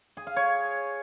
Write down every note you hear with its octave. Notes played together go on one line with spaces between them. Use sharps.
G#4
F5
C#5